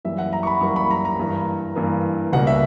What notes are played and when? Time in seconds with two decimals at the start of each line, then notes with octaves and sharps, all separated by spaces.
0.05 F#2 E3 G3 A#3 E5
0.18 F#5
0.33 A#5
0.43 C#6
0.47 B5
0.61 F#2 E3 G3 A#3 C#6
0.76 B5
0.91 A#5
1.05 A#5
1.19 G2 E3 A#3
1.75 G2 E3 A#3
2.33 C#2 B2 G3 A#3 F#5
2.47 E5